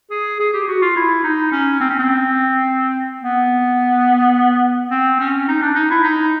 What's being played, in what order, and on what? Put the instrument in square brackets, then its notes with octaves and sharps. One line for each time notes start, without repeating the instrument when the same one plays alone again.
[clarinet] G#4
G#4
G4
F#4
F4
E4
D#4
C#4
C4
C#4
C4
B3
C4
C#4
D#4
D4
D#4
E4
D#4